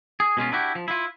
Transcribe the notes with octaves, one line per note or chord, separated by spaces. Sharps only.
G#4
B2 G#3 C#4 F4
D4 E4 F#4 G4
F3
E4 F4